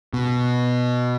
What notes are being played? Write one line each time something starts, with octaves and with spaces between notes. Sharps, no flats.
B2